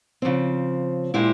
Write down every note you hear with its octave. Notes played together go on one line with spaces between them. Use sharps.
C#3 F3 C4
A#2 G#3 E4 G4 C5